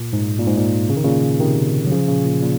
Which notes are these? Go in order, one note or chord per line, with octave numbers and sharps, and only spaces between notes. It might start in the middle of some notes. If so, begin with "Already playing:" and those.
Already playing: A#2
G#2
A#2
G#2
A#2
C#3
D#3
A#2 C#3
C3 D#3
F#3
C#3 F3
A#2 C#3
A#2
A#2